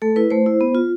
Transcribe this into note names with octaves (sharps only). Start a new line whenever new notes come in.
A3 A4
E4 B4
A3 C5
E4
B3
F4